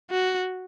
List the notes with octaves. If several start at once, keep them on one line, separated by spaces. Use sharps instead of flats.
F#4